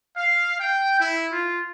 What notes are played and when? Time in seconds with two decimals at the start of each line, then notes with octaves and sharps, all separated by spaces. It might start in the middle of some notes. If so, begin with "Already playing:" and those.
0.17 F5
0.59 G5
0.98 E4
1.31 F4